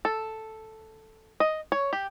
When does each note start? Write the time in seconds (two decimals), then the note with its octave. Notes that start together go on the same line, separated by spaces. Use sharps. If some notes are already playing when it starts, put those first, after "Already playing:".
0.05 A4
1.40 D#5
1.72 C#5
1.93 G4